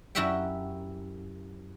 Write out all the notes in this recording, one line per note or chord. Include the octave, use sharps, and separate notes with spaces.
F#2 E4 F#4 G4 E5 G5